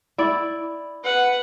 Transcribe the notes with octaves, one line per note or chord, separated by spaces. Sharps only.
E4 D5
B4 F#5